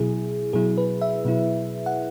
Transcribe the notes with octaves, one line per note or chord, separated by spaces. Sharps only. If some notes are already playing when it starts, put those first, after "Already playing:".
Already playing: B2 F#3 E4 G#4
B2 F#3 E4 G#4
B4
E5
B2 F#3 E4
F#5